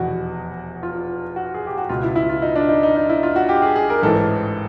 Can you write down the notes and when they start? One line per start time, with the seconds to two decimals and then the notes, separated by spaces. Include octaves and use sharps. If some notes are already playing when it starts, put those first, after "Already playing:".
Already playing: F1 E2 B2 F#4
0.83 F4
1.36 F#4
1.54 G#4
1.67 G4
1.78 F#4
1.89 C#2 B2 F4
2.03 E4
2.16 E4
2.29 F4
2.42 D#4
2.56 D4
2.69 D#4
2.83 D#4
2.96 D#4
3.09 E4
3.23 F4
3.36 F#4
3.49 G4
3.62 G#4
3.76 G#4
3.90 A#4
4.02 A1 G#2 E3 A4